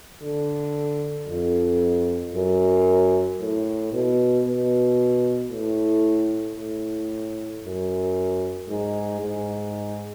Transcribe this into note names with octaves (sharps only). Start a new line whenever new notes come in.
D3
F2
F#2
A2
B2
B2
A2
A2
F#2
G#2
G#2